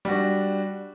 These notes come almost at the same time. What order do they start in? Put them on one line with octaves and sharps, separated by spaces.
G3 F#4 D4